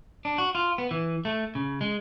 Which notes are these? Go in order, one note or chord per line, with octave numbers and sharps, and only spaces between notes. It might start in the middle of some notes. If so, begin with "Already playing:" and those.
D4
F#4
F4
B3
E3
A3
C#3
G#3